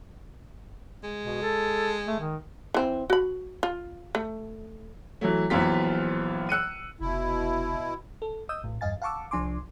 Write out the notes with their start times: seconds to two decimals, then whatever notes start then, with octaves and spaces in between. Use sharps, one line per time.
1.03 G#3
1.23 B2
1.42 A4
2.08 A3
2.20 D#3
2.74 E3 C4
3.10 F#4 B5
3.63 F4
4.15 A3
5.21 E3 F#3 A3
5.50 A#1 E3 F#3 B3 F4 B6
6.49 E6 F#6 C#7 D#7
7.00 F1 B2 E4
8.22 A4
8.49 D#5 D#6 E6 G6
8.64 A#1 A2
8.81 E2 G2 D#5 F5 G#5 A6
9.02 F5 F#5 A5 C#6 D6 E6
9.31 C2 F3 D4 G#5 C6 D6